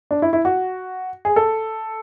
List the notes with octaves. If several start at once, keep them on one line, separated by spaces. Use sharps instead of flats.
D4
E4
E4
F#4
G#4
A4